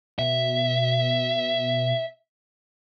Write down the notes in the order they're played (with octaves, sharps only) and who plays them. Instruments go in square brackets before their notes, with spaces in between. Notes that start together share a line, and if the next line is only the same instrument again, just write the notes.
[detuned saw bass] B2 [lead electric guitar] E5